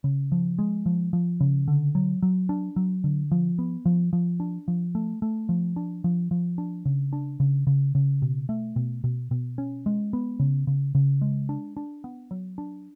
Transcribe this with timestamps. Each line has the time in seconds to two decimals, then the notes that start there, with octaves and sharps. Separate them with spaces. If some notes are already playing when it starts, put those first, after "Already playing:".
0.04 C#3
0.32 F3
0.59 G#3
0.86 F3
1.13 F3
1.40 C#3
1.68 D3
1.95 F#3
2.22 F#3
2.49 D4
2.76 F#3
3.04 D3
3.31 F3
3.59 B3
3.86 F3
4.13 F3
4.40 D4
4.68 F3
4.95 A3
5.22 A3
5.49 F3
5.76 D4
6.04 F3
6.31 F3
6.58 D4
6.85 C#3
7.13 D4
7.40 C#3
7.67 C#3
7.95 C#3
8.22 B2
8.49 A3
8.76 B2
9.04 B2
9.31 B2
9.58 C#4
9.86 G#3
10.13 B3
10.39 C#3
10.67 C#3
10.95 C#3
11.21 G#3
11.49 D4
11.77 D4
12.04 B3
12.31 F#3
12.58 D4